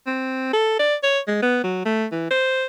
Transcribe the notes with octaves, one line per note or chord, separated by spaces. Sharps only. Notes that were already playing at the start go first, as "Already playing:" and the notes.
C4
A4
D5
C#5
G#3
B3
F#3
A3
E3
C5